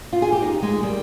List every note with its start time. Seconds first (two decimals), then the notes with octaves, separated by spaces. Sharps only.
0.13 F4
0.22 G#4
0.32 G4
0.42 D#4
0.63 G#3
0.83 D#3 G3